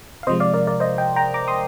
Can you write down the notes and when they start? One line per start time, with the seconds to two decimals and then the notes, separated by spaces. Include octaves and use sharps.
0.23 F5
0.27 C3 F3 G#3 C5 D#5
0.40 D5 F5
0.54 A#4 D5
0.67 A#4 D5
0.80 C5 D#5
0.98 D#5 G5
1.16 G5 A#5
1.34 A#5 D6
1.48 C6 D#6